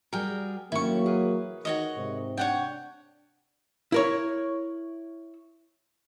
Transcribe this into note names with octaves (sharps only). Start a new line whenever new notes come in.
G3 F#4 G#4 A#4 G5
D#3 F#3 A3 A#3 C#4 E4 C#6
G#4 A#4 B4
D#3 F#4 C#5 D#5
G#2 C3
D4 C#5 F#5 G5
E4 A#4 C#5